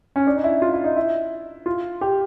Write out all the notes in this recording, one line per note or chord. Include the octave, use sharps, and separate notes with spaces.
C#4
D4
D#4
E4
F4
E4
D#4
E4
F4
G4